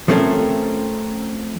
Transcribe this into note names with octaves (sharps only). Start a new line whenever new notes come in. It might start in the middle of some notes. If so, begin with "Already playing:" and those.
F3 A3 C4 C#4 A4 A#4